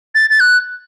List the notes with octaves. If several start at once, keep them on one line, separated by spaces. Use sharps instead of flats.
A6
A6
F#6